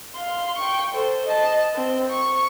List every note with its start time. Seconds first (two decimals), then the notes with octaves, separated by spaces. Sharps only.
0.15 F5 C6
0.59 G5 C#6
0.94 A4 C5
1.26 D#5 A5
1.75 C4
2.12 C#6